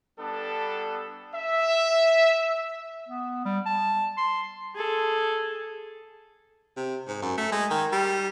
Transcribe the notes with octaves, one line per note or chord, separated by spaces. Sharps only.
G3 B3 D4 A4
E5
B3
G3
A5
C6
G#4 A4
C3
G#2
F#2
A3
G#3
D#3
G3